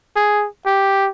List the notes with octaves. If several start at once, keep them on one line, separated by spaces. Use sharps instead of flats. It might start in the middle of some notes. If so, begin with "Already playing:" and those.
G#4
G4